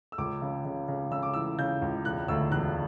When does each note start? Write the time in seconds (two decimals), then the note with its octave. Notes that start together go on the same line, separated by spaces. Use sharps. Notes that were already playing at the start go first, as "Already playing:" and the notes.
0.12 E6
0.18 C#2 D6
0.42 C#3
0.65 C#3
0.88 C#3
1.11 C#3 E6
1.23 D6
1.34 E3 E6
1.59 C#3 G6
1.82 C#2
2.05 E1 F#6
2.28 D2 E6
2.51 E1 F#6